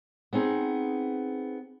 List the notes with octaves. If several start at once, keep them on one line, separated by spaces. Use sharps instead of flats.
B3 C4 D#4 G#4